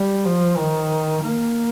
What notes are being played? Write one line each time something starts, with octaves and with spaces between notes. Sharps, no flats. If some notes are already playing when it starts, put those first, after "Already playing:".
Already playing: G3
F3
D#3
A#3